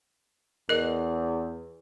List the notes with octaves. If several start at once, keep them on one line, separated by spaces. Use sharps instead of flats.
E2 A#4 D#5